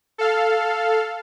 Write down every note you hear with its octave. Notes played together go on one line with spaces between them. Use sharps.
A4 F5